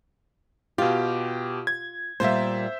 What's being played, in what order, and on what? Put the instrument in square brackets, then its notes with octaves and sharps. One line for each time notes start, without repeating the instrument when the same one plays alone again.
[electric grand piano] B2 G4 [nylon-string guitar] F4
[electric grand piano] G#6
[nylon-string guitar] A#2 G3 A#3 [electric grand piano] C5 E5